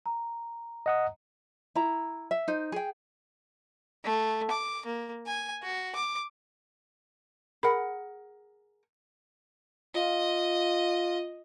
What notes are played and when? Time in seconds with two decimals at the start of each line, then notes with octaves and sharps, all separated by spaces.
0.06 A#5
0.86 D#5 F#5 D#6
1.75 E4 A#5
2.31 E5
2.48 D#4 C5
2.72 G#4 G5
4.04 A3
4.50 D6
4.85 A#3
5.27 G#5
5.63 F#4
5.95 D6
7.63 G#4 A#4 F#5 B5
9.94 F4 D#5